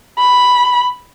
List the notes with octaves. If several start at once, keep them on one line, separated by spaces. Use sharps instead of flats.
B5